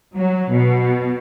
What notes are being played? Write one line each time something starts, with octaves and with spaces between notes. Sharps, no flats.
F#3
B2